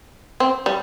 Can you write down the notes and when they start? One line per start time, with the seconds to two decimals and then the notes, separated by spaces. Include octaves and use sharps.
0.40 C4
0.66 G3